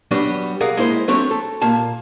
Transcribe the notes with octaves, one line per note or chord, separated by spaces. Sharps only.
F#3 G3 B3 D4 F#4
C2 G#4 A#4 D5 F5 F#5
G#3 A#3 E4 C5
F#3 A3 C4 D4 C#5
A4
A#2 A#3 A5